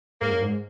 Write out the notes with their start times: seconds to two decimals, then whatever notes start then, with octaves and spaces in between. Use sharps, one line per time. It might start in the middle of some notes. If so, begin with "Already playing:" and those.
0.21 G#2 A#3
0.31 F#2
0.42 G#2